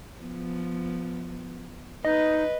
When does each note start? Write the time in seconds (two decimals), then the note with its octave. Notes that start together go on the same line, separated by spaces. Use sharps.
0.20 F3 B3
2.05 D#4 B4 D#5